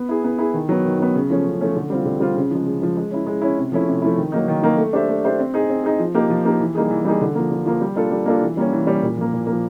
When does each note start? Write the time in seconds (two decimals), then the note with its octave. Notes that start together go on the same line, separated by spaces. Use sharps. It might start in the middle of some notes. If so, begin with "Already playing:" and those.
Already playing: B3
0.09 E4 G#4
0.24 B3
0.38 E4 G#4
0.54 D#3
0.69 F#3 B3
0.85 D#3
0.99 F#3 B3
1.15 C#3
1.30 F3 A3 C#4
1.46 C#3
1.61 F3 A3 C#4
1.76 D3
1.90 G3 C4 F4
2.05 D3
2.20 G3 C4 F4
2.36 C#3
2.51 F3 G#3
2.66 C#3
2.81 F3 G#3
2.97 G#3
3.11 C#4 E4
3.27 G#3
3.42 C#4 E4
3.58 C3
3.72 F3 A3 C#4 E4
3.87 C3
4.02 F3 A3 C#4 E4
4.17 D#3
4.32 F#3 A#3 D#4
4.48 D#3
4.62 F#3 A#3 D#4
4.77 A3
4.93 D4 G4 C5 E5
5.09 A3
5.24 D4 G4 C5 E5
5.39 C4
5.54 D#4 G#4
5.69 C4
5.84 D#4 G#4
5.99 F3
6.15 A#3 D#4 G4
6.30 F3
6.45 A#3 D#4 G4
6.60 E3
6.75 G3 A#3 D#4 G#4
6.90 E3
7.05 G3 A#3 D#4 G#4
7.21 D3
7.35 F3 A#3
7.51 D3
7.66 F3 A#3
7.81 G3
7.96 A#3 D4 F4 A4
8.10 G3
8.26 A#3 D4 F4 A4
8.41 E3
8.57 G3 A#3 C#4
8.72 E3
8.87 G3 A#3 C#4
9.02 A#2
9.17 F3 A#3
9.33 A#2
9.47 F3 A#3